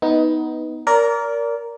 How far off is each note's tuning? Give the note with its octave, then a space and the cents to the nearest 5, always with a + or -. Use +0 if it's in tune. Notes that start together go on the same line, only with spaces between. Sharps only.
B3 +0 D#4 +15
A#4 +0 D5 -30